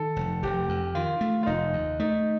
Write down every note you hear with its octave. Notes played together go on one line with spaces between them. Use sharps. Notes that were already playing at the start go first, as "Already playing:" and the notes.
Already playing: D#3 A4
F1
F1 G4
F2
D#3 F4
A3
F4
F1 D#4
D#2
A3 D#4